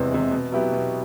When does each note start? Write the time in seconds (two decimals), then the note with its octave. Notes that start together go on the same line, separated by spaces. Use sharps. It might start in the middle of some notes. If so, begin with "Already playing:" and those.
Already playing: E2 C3 E3 G#3
0.11 C3 E3 G#3
0.31 B2
0.52 F#3 B3 E4 G4
0.72 B2